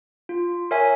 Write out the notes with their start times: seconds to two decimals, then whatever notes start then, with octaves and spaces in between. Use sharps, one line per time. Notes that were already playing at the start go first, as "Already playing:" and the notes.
0.29 F4
0.71 A#4 C#5 E5 G#5